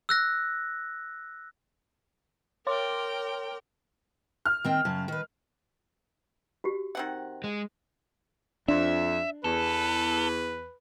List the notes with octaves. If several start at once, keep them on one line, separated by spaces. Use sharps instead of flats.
E6 F#6 A#6
A#4 C#5 G5 C6 D6
F6
D#3 C4 G5
F#2 C#3 A5
D#3 B4
F#4 G4
D#3 C4 F#5
G#3
F2 D4 E5
E2 A4 B4